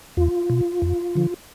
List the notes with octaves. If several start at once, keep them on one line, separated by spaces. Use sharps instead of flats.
E2 F4
B2
F2
D3 F3